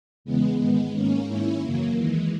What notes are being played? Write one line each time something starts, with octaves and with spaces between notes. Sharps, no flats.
E2 C#3 E3 G#3 B3
G#2 D#3 G#3 B3
G#2 D#3 A#3 C#4
G#2 D#3 C#4 E4
F#2 C#3 E3 F#3 A#3
D#2 D#3 E3 G#3